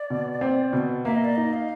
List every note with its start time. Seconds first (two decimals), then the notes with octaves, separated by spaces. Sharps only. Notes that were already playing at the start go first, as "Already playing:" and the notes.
Already playing: D5
0.10 B2
0.41 C4
0.73 B2
1.05 A#3 E5
1.15 D#5
1.25 D5
1.35 D#4 D#5
1.53 F5